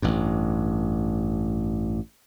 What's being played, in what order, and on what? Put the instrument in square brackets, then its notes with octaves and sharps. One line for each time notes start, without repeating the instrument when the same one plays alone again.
[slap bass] A1 G2